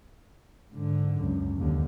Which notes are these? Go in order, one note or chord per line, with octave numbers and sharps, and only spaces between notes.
G#2 D3
C#2 F#2
D#2 D3